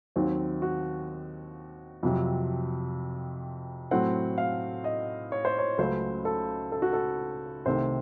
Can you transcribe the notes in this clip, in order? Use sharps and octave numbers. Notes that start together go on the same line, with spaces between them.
D#2 D#3 F#3 C4
F#4
F2 C3 F#3
A2 F#3 A3 C4 F#5
F5
D#5
C#5
C5
C#5
C#2 C#3 F#3 A3 C5
A4
A4
F#4
A4
C2 C3 D#3 A3 C5